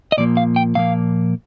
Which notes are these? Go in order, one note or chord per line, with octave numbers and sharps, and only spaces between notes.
D#5
A#2 F3 A#3 D5
F5
G5
A#2 F3 A#3 F5